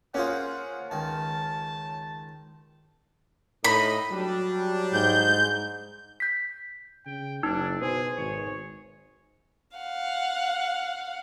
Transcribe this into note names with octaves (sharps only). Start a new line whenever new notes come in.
A#3 C#4 F4 G#4 C5 F#5
C#2 D#3 A5
A2 D#4 D#5 B5
F#3 G3 D4
G#2 G6
G6 B6
C#3 G5
F#1 D4 D#4 A5 E6
B2 G#4 B4 C5 G#5
G#1 C#5
F5 F#5